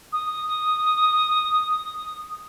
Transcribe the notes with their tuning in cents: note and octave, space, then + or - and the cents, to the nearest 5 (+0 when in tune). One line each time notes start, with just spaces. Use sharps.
D#6 -5